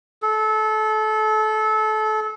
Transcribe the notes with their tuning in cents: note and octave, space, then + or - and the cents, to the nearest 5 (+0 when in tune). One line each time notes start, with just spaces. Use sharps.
A4 -25